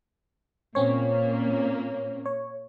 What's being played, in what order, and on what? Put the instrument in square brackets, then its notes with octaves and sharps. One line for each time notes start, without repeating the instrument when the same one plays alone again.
[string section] A#2 A#3 [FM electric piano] C4 C#4 C#5
[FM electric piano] C#5